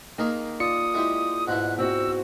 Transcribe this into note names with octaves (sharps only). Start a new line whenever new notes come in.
D#3 A#3 G#4
F4 D5 D#6 C#7
G#3 E4 G4
G#2 B2 E4 F#6
C4 F#4 E6